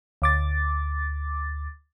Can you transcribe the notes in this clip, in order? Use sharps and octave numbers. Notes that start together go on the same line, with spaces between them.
D2 D6 A6